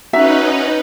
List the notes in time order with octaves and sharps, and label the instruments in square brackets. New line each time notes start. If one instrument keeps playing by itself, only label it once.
[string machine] C#4 D#4 B4 [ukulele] F#4 E5 A#5